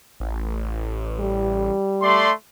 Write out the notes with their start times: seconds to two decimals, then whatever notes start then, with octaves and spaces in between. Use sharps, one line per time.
0.20 A1
1.20 G3
2.02 A3 D5 C6